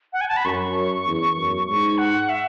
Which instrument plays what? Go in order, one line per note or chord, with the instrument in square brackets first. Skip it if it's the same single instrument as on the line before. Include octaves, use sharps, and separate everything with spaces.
[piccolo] F#5
G#5
A5
B5
[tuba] F#2 [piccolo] C#6
[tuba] E2
F#2
[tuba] G#2 [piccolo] C#6
[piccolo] F#5
E5